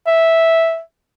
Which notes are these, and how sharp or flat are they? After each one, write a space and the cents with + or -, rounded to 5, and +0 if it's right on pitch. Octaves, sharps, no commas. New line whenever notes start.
E5 -5